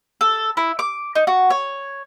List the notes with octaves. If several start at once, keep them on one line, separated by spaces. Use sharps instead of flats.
A4
E4
D6
D#4
F#4
C#5